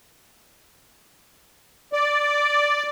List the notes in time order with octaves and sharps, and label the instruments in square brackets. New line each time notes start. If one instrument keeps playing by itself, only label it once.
[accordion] D5